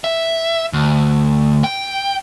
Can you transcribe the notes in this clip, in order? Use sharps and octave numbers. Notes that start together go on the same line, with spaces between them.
E5
D2
G5